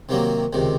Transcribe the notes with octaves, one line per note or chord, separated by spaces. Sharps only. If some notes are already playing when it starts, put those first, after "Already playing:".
C3 D#3 F#3 A#3
C#2 C3 D#3